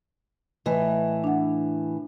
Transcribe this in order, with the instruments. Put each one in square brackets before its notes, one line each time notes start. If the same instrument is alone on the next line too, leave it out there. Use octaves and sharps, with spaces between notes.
[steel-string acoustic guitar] A2 E3 [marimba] B4 D#5
[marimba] D4 F#5